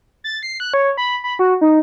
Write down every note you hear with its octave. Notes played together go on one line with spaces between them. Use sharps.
A6
C7
F#6
C#5
B5
B5
F#4
D#4